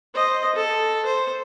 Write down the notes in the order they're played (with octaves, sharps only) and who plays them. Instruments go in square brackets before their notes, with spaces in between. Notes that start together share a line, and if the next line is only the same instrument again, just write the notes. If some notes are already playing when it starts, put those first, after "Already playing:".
[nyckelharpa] C5 D#5
A4
C5